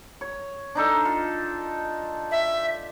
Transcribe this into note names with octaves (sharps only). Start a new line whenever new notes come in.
C#5
D4 D#4 A4
F4
E5